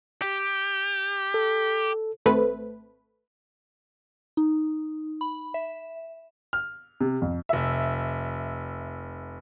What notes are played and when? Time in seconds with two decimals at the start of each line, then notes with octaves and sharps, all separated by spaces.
0.22 G4
1.34 A4
2.26 G#1 A3 C4 B4
4.37 D#4
5.21 B5
5.54 E5
6.53 F6
7.01 C3
7.22 F2
7.49 F1 E5